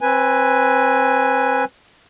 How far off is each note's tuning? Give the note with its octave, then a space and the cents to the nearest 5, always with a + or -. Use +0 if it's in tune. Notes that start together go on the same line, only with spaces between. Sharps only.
C4 +25 B4 +0 G#5 +0